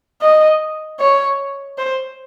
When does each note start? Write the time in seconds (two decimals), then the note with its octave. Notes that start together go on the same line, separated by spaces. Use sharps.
0.22 D#5
1.00 C#5
1.78 C5